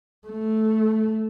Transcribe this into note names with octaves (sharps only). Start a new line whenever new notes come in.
A3